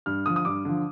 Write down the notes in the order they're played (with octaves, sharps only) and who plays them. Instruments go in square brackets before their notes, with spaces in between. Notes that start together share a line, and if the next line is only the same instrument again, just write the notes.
[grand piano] G2 F6
D3 F3 D#6
D#6
G2 D6
D3 F3